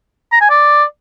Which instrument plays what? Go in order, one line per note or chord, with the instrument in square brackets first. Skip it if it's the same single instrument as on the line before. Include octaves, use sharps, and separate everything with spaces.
[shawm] A#5
G#5
D5